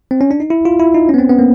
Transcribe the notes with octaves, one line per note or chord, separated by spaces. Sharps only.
C4
C#4
D4
D#4
E4
F4
E4
D#4
C#4
B3
C4
B3
A#3